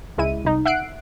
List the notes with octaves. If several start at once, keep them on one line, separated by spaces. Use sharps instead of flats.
C#2 G#3 E4 D#7
C2 D#4
E5 F#5 F#6 C7 D7